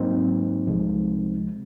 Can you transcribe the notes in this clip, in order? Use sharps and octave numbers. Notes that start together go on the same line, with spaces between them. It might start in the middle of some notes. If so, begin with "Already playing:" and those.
Already playing: G#2 F#3 A#3 C4 D#4
C2 C3 F3 G#3